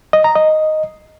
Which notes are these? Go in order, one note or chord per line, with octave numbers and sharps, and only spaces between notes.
D#5
A#5
D#5